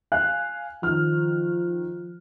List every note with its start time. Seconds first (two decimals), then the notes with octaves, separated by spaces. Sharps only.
0.12 F5 G#5 F#6
0.83 D#3 F3 F6